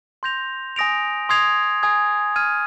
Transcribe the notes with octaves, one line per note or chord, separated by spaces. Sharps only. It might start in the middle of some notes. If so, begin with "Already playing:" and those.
C6 G6 A#6 F7
G#5 D#6 A#6 D7 F7
C6 D#6 G#6 C7 F7
G#5 D#6 G#6
F6 G#6 D#7